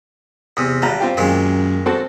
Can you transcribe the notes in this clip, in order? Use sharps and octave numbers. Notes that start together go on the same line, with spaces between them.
E2 C3 D#6
G#1 G3 A#5
C4 F4 G4
F#2 A#2 D#3 G#3
C4 F#4 A4